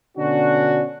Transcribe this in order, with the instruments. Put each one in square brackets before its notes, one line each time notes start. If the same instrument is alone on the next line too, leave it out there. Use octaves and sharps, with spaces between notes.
[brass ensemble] B2 D3 C#4 D4 F#4